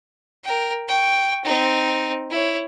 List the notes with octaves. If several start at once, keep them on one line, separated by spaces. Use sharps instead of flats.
A#4 G5
G5 C#6
C4 D#4
E4 C#5